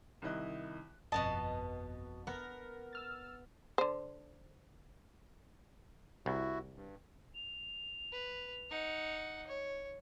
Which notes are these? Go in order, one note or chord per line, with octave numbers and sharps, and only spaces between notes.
C2 D#3 E4 D#5 F#6
G1 F2 B2 B3 D#5 A5
B3 A#4
E6 F6 A6
D3 C5
C2 E4 F#4
G2
F7
B4
D#4 F#5
C#5